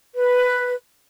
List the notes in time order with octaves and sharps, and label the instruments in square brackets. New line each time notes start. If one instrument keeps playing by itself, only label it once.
[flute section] B4